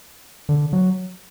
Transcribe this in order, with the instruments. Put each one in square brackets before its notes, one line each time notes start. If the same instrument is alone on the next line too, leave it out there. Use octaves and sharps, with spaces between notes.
[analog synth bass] D3
F#3